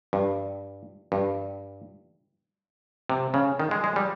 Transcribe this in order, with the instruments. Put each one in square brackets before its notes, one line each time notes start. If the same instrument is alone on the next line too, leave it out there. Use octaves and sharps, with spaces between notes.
[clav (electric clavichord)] G2
G2
C3
C#3
D#3
G#3
G#3
G3